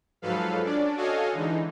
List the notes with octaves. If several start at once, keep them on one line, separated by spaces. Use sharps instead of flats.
G#2 F3 F#3 A4 B4 F5
C#4 D4 D5
F#4 A4 C#5 D#5 F5 G#5
D3 E3 G#3 D#4